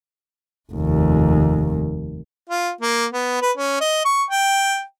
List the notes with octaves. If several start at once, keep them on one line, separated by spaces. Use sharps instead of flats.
F1 D#2
F4
A#3
B3
B4
C#4
D#5
C#6
G5